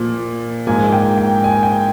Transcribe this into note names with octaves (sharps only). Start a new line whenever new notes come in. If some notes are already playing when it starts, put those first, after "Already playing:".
Already playing: A#2 F3 A#3
G#2 F3 A#3 G#5
G5
G5
G#5
G5